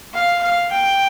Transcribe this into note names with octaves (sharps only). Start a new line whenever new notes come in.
F5
F5
G5